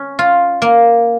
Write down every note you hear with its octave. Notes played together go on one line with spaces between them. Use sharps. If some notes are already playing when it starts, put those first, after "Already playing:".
Already playing: C#4
F4
A#3